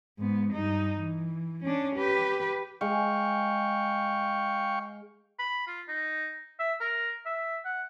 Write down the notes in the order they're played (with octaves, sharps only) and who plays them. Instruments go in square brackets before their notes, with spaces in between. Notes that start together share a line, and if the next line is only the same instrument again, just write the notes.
[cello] G#2 B3
G2 D#4
E3
C#4 D4
G4 B4
[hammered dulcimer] G#3 [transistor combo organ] F5 G5 C#6
[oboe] B5
F4
D#4
E5
A#4
E5
F#5